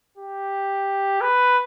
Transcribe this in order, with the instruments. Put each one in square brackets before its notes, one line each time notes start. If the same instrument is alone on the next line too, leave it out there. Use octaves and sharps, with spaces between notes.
[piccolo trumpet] G4
B4